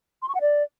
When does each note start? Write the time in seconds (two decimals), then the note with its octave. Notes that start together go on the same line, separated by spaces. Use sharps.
0.22 C6
0.28 C#6
0.35 F#5
0.41 D5